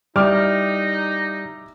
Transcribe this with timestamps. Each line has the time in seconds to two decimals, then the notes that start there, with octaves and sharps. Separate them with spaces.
0.16 G3 D#4 E4 D6 F6